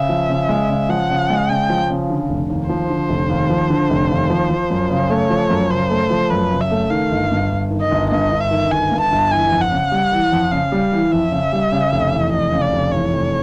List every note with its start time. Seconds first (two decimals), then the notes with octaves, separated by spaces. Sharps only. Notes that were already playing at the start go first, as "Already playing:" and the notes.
Already playing: C#3 E5
0.09 F3
0.29 C#3
0.49 G#3
0.69 C#3
0.89 F3 F#5
1.10 C#3
1.30 G#3
1.49 C#3 G5
1.69 F3
1.90 C#3
2.10 D3
2.29 F1
2.50 D#2
2.69 F3 C5
2.90 D3
3.09 F1
3.29 D#2
3.50 F3
3.70 D3
3.90 F1
4.10 D#2
4.30 F3
4.50 F3
4.70 F#2
4.90 C#3
5.10 A3 C#5
5.30 F3
5.50 F#2
5.70 C#3 C5
5.90 A3
6.10 F3
6.30 F#2 B4
6.51 C#3
6.61 E5
6.71 A3
6.90 D#3 F5
7.11 G1
7.31 G2
7.51 G1
7.70 D#3
7.81 D#5
7.91 G1
8.11 G2 D#5
8.32 G1
8.41 E5
8.51 D#3
8.71 G1 G#5
8.91 G2
9.01 A5
9.11 G1
9.31 E3 G#5
9.51 F2
9.61 F#5
9.72 C#3
9.92 G3
10.12 E3
10.32 F2
10.52 C#3 F5
10.72 G3
10.92 E3
11.12 F2 E5
11.32 C#3
11.52 G3
11.72 C#3
11.92 F1
12.13 E2
12.32 F1 D#5
12.52 C#3
12.62 D5
12.73 F1
12.92 E2 C#5
13.13 F1